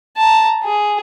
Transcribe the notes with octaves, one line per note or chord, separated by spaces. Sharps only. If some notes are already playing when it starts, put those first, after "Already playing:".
A5 A#5
G#4